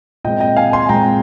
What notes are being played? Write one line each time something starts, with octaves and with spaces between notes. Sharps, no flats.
A#2 G#3 C4 D#5 G5
D#5 G5
F5 G#5
G#5 C6
A#2 G#3 C4 G5 A#5